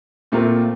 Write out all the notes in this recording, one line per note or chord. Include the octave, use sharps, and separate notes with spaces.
A#2 A3 C4 F4 A#4